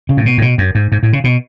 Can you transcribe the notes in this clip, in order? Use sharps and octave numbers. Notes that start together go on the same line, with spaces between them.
C#3
A2
B2
A2
B2
F#2
G#2
G#2
A2
C#3
B2